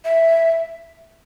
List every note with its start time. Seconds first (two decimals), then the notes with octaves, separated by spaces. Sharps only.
0.04 E5